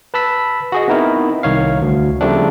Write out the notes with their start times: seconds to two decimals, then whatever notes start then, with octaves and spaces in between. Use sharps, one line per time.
0.14 B4 A5 B5 E6 B6
0.72 F#4 G#4 D#5
0.88 B3 C4 D#4 E4 A#4
1.43 C2 D#3 C#5 F5
1.82 D2
2.21 C#3 F3 G3 A3 C4 D4